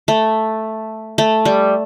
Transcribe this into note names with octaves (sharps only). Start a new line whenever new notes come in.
A3
A3
G3